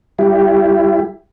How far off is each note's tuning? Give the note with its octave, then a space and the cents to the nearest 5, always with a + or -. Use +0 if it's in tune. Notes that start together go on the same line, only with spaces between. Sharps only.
G3 +0 E4 +30 G4 +0